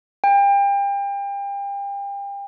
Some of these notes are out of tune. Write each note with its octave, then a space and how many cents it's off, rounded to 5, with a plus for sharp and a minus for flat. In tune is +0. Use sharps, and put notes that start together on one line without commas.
G5 +35